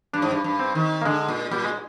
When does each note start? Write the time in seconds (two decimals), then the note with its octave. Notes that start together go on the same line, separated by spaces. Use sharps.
0.14 G2 D4
0.22 G#2
0.31 G2
0.44 G2
0.59 C4
0.75 D#3
1.02 A#3
1.05 D3 G#3
1.28 A#2
1.51 A#2 G3
1.64 G#3